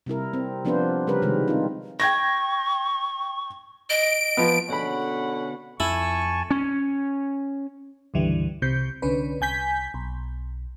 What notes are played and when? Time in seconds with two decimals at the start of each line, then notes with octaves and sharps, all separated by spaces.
0.06 C3 G3 E4 A#4
0.33 C4
0.65 F3 B3 D4 F4 B4 C5
1.07 C#3 G3 C#4 A#4 B4
1.22 C3 D#3 G3 G#3
1.48 C4 D#4 F4
2.00 G5 C#6 G#6 A#6
3.90 D#5 D7
4.37 F3 B3
4.69 B2 D3 C#4 F#5 B5
5.80 F2 E4 G#5 A5 C#6
6.51 C#4
8.14 C#2 G2 D3 E3 G3
8.62 C2 C3 G6
9.02 C2 D3 C#4 B4
9.41 C2 G#5 G6 B6
9.94 B1